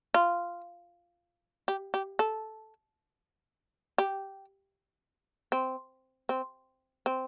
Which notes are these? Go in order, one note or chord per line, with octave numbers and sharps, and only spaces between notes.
F4
G4
G4
A4
G4
C4
C4
C4